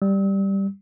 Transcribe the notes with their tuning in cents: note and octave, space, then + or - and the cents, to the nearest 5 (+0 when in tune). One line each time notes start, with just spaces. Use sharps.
G3 +0 E6 -45